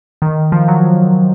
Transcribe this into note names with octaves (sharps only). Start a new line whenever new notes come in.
D#3
F3
F#3